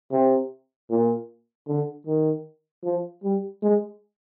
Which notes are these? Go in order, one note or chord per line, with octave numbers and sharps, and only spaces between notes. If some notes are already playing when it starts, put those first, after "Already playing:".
C3
A#2
D3
D#3
F3
G3
G#3